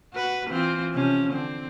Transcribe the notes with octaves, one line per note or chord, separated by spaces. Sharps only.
F#4 B4
E3 C4 F4
C3 F3 C#4
D3 C4